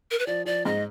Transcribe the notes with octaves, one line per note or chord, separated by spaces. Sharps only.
A#4
B4
F3 D5
F3 D5
G#2 D#5